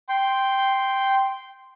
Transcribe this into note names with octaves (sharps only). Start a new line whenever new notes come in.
G5 C6